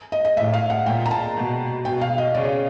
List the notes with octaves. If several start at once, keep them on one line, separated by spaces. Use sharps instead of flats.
D#5
D#5
A2 E5
F5
F#5
A#2 G5
A#5
A5
B2
B2 G5
F5
D#5
C#3 D5
C#5